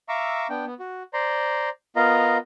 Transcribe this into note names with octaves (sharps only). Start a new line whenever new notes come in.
E5 F5 A#5 C#6 D6 E6
B3 D4 G5
B3
F#4
C5 D5 A#5 C6
B3 F4 A#4 D#5 F5 A#5